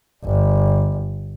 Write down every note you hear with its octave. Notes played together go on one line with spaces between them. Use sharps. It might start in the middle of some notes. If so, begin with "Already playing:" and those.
G1